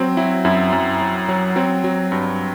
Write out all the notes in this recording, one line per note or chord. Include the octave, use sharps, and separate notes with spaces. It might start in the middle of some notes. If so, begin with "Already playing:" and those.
Already playing: F#3 C4
F#3 E4
F#2 E4
F#2
F#3
F#3
F#3 C4
F#3
G2